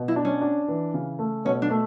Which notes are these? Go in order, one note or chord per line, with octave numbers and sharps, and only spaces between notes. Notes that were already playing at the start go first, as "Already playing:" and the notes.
Already playing: B2
E4
D4
C#4
D4
E3
C#3
A3
B2 C#4
D4
A3